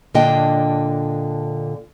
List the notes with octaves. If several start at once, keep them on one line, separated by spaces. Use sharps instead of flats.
A#2 D3 D4 D#5 G5